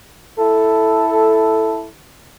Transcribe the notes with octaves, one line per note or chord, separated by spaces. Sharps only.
E4 A4